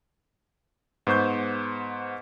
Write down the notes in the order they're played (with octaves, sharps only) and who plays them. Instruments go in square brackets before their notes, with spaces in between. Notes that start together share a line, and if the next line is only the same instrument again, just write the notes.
[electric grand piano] G#2 B3 C5 C#6 G6